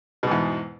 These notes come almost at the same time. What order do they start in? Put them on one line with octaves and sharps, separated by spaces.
B2 G#2 E2